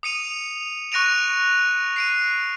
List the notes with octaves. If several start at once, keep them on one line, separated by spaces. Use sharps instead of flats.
D#6 C#7 D#7 F7
C#6 F#6 A#6 D7 D#7 F7
C7 D7 D#7